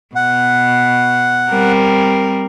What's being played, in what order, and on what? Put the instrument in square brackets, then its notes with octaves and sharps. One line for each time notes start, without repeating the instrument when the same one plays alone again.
[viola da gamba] B2 [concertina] F#5
[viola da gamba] G3 C4 A#4